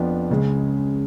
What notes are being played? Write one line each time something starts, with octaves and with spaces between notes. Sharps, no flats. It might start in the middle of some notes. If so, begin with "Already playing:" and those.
Already playing: F2 F3 B3 D4
C#2 C#3 G#3